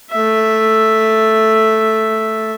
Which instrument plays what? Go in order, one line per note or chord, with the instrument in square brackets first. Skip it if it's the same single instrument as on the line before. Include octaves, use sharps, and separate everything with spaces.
[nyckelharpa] A3 E5